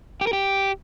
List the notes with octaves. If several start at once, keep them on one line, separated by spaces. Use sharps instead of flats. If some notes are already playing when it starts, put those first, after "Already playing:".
G4
A#4
G4